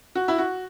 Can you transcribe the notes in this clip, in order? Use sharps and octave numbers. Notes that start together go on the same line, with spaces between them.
F#4
E4
F#4